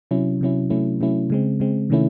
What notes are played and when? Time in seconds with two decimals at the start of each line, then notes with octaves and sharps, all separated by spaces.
0.11 C3 F#3 C#4 E4
0.41 C3 F#3 C#4 E4
0.70 C3 F#3 A3 C#4 E4
1.01 C3 F#3 A3 C#4 E4
1.30 C#3 G#3 C4
1.60 C#3 G#3 C4
1.90 C3 D#3 A3 C#4 E4